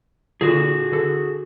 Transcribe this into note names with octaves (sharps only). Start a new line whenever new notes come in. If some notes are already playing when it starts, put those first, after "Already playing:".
A#2 D3 F#4 G#4
D3 A4